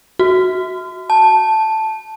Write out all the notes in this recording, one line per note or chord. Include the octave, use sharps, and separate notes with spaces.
F#4
A5